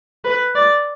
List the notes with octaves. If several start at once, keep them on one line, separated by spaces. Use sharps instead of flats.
B4
D5